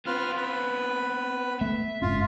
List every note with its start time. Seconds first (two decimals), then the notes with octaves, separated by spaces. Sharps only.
0.06 B3 C4 F4 B4 F6
0.37 B4
1.61 A3 E5
2.02 F#1 G#2 C#4 F4